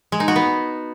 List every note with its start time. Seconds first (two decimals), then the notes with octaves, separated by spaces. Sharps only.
0.12 G#3
0.20 D#4
0.28 F#4
0.36 B3